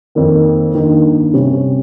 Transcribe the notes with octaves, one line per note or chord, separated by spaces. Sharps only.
F2 D#3 A#3
G2 D#3 A#3
C3 G3 C#4